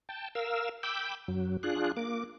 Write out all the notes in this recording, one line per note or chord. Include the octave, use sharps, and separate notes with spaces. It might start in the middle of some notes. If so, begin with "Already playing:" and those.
G5 A5
A#4 F5 E6
G5 B5 D6 E6 G6
F#2 F#3
D4 F4 G#4 F#6
A#3 D6